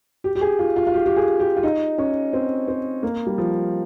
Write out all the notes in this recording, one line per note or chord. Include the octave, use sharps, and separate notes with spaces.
G4
G4
G#4
F4
F4
F4
G4
G4
G#4
G4
F4
D#4
C#4
C4
C4
A#3
G3
F3